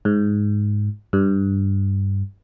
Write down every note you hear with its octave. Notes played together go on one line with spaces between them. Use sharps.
G#2
G2